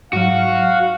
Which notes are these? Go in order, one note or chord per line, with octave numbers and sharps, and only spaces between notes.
G#2 F#3 F#4 F5